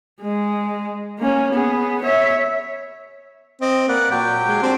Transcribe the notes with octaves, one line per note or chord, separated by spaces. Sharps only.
G#3
A#3 C#4
B3 G#4
C#5 E5
C4 D#5
A#3 B4 D5 F#5
A#2 F#3 G4 G5
G#3
C4 D4 G4 C5